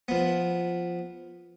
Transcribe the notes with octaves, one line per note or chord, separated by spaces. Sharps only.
F3 B3